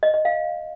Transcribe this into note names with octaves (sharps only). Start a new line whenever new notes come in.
D#5
D#5
F5